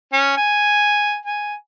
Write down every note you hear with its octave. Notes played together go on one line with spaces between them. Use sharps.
C#4
G#5
G#5